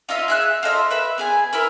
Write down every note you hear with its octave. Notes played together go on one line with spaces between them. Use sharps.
D#4 F4 D#5 E5
G#4 E5 F#6
F4 A4 D#5 E5
B4 E5 B5
B3 G#4 G#5
E4 A#4 B4